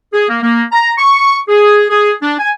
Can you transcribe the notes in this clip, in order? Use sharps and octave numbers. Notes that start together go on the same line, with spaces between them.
G#4
A#3
A#3
A#5
C#6
G#4
G#4
D4
G#5